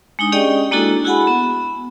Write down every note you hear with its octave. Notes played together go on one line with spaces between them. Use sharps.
G#3 D4 D#4 D#6
C#4 G4 G#4 D5 D#5 G5
G#3 A#3 D4 E4 F#4 A4
E4 F#4 G#4 F#5 G#5 B5
B3